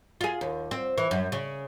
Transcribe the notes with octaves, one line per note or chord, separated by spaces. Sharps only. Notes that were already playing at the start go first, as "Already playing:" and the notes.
F4 G#4
D#2
C4
E3
F#2
C#3